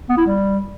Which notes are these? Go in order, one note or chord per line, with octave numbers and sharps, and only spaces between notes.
B3
E4
G3